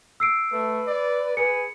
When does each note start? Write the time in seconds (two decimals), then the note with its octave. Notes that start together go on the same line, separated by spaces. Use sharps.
0.20 E6 C7 D7
0.53 A3 B4
0.87 D5
1.37 G#4 B4 C#7